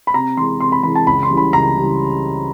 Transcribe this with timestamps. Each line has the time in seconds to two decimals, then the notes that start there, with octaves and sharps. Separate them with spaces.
0.07 B5
0.14 C3 A#5
0.37 E3 G#3 C6
0.60 C3 C6
0.72 B5
0.83 E3 G#3 B5
0.95 A5
1.07 C#2 B5
1.23 C6
1.29 C#3 E3 G3
1.37 B5
1.53 C#2 A#5
1.77 C#3 E3 G3